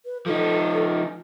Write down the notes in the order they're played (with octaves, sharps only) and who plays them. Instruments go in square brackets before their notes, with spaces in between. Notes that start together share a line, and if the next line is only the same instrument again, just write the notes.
[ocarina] B4
[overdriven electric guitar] F3 D#4 [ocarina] A4